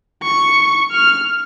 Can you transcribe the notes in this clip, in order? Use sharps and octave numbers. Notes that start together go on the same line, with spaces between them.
C#6
F6